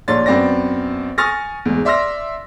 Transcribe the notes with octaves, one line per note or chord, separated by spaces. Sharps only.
A#1 D4 C#5 C6 A6
F#2 B3 C4 D5 A#6
G#5 C#6 D#6 F6 A6 A#6
E2 G#2
D5 E5 C6 E6 F6 A#6